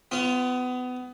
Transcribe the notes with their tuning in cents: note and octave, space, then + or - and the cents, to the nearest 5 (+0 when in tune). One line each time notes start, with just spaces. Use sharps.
B3 +25 F4 -15